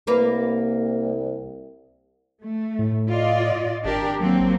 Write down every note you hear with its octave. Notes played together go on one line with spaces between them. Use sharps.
C2 A#3 B4
A3
A2
F4 D5 D#5
G#1 D4 G4 A#4
F#3 A#3 C4